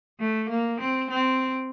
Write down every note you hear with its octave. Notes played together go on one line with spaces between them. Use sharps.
A3
A#3
C4
C4